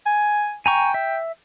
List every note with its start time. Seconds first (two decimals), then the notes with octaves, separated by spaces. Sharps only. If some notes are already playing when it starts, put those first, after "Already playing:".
0.06 G#5
0.66 G5 G#5 A#5 C#6
0.94 E5